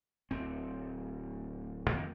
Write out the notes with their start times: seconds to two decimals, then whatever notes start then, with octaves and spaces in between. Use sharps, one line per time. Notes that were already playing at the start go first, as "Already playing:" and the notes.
0.31 D1 C4
1.91 F2 D#3 A#3 C4